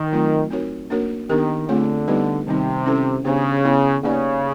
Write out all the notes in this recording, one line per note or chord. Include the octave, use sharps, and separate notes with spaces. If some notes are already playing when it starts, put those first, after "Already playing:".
Already playing: D#3
F#3 A3 C4 F4
C4 D#4 F#4 A#4 C#5
A#3 D4 F#4 A#4 C#5
D#3 B3 D4 G4 A#4
D3 A3 C4 F4 G#4 C#5
G3 B3 D#4 G4 B4
C3 D#3 G3 C4 D#4
C#4 E4 A4 C5
C#3 B3 D4 G4 C5
B3 E4 G#4 C#5
C#3 A#3 D#4 G4 B4 D5